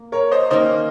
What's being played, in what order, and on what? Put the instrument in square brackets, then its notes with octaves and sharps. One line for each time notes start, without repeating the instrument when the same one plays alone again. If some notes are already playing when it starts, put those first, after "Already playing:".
Already playing: [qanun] A#3
[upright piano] A#4 C#5
C5 D#5
[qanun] D#3 A#3 C#4 [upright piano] C5 D#5